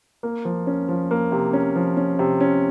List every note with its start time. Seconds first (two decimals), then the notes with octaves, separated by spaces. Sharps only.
0.23 A#3
0.45 F3
0.67 C#4
0.89 F3
1.11 A#3
1.32 C3
1.53 C#4
1.76 F3
1.97 C#4
2.19 C3
2.41 C#4